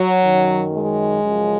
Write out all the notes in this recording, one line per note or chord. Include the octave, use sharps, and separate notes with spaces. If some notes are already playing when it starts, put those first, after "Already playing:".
Already playing: F#3
F#2 D#3
G#3
F#2 C#3 F3